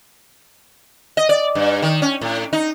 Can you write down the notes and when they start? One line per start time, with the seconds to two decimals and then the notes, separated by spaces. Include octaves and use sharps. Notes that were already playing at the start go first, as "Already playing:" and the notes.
1.17 D#5
1.29 D5
1.55 G2
1.82 D#3
2.02 C#4
2.21 A2
2.53 D#4